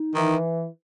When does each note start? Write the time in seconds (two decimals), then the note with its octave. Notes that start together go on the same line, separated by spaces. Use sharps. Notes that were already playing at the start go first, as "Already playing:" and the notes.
Already playing: D#4
0.14 D#3 E3